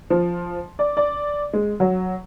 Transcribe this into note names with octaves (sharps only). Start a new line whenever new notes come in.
F3
D5
D5
G#3
F#3